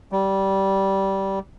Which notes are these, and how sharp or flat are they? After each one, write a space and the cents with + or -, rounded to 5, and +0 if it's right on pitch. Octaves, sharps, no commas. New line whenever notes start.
G3 -15